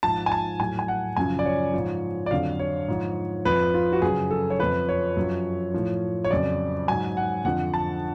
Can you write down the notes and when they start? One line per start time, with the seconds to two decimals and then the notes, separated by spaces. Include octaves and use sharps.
0.03 G#2 F3 A5
0.26 G#5
0.32 A5
0.60 A2 F#3 G#5
0.79 G#5
0.88 F#5
1.16 F#2 C#3 F3 G#5
1.39 D5
1.46 C#5
1.73 G#2 F3
2.26 D5
2.31 F2 D3 F#3 F5
2.59 C#5
2.88 G#2 F3
3.45 F2 F3 B4
3.74 F4
3.93 F#4
4.02 F#2 C#3 F#3 G#4
4.31 A4
4.50 C#5
4.59 F2 F3 B4
4.89 C#5
5.17 F#2 F3
5.74 A2 F3
6.25 C#5
6.31 F2 C#3 F#3 D5
6.88 G#2 F#3 G#5
7.17 F#5
7.45 F2 D3 F3 F#5
7.74 A5